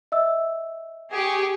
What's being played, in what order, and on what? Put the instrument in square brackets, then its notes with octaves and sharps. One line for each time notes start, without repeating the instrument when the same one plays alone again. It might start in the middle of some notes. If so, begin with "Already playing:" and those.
[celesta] D#5 E5 E6
[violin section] G4 G#4 C#6